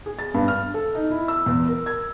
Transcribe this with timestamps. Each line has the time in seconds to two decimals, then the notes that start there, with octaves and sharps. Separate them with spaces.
0.06 G#4
0.19 A6
0.34 G2
0.48 F6
0.74 A4
0.95 D#4
1.11 E4
1.28 E6
1.46 E2
1.68 A#4
1.86 G#6